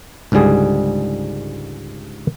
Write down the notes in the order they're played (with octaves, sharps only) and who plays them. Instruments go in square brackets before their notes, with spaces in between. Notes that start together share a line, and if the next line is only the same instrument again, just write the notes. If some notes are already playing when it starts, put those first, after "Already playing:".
[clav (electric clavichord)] C#2 G#2 D3 G3 G#4